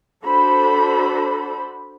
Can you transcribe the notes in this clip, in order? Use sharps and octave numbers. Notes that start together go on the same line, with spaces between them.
D4 F#4 A4 C5 B5